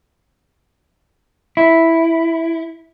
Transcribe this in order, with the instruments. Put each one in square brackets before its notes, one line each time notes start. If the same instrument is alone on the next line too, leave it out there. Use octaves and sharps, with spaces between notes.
[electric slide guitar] E4